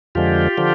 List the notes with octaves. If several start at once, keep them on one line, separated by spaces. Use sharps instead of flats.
F2 D3 F3 G#3 F4 G4
D3 F3